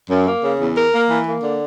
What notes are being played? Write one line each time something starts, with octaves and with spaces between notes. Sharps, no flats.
F#2
A#3
C#3
E2
A#4
A#3
E3
A#3
D3